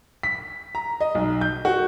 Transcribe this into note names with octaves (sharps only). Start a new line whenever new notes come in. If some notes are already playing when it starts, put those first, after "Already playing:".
B6
A#5
D#5
B1
G6
F#4